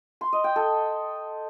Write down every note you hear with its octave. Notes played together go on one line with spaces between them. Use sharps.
C6
D#5
G5
A4